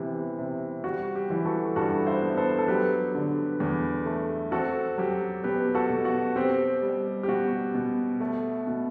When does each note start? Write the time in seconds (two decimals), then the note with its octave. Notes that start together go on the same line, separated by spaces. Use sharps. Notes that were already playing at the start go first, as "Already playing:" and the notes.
Already playing: C3 E3 B3
0.39 C3
0.84 G3 F#4
1.15 G4
1.30 E3
1.45 F#4 A4
1.76 G2 F#4 A4
2.07 C5 E5
2.22 B3
2.37 A4 C5
2.58 A4
2.68 F#3 G4 B4
3.15 D3
3.60 E2
4.06 A3
4.52 C4 F#4 A4
4.98 F#3 G4
5.44 B2 G4 B4
5.75 F#4 A4
5.90 B2
6.05 F#4
6.36 C4 G4
6.82 G3
7.23 G4
7.28 B2 F#4
7.74 B2
8.20 A3
8.67 B2